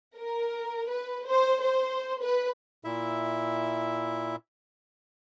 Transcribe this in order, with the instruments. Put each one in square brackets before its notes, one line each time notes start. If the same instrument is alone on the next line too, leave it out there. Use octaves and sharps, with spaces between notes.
[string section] A#4
B4
C5
C5
B4
[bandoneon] A#2 E4 E5